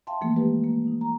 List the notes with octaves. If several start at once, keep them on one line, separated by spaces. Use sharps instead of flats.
E5 F5 G5 A5 C6
E3 F3 A3 A#3
G#3 A#3 D#4 G4 B4
A#3
D#4
A#5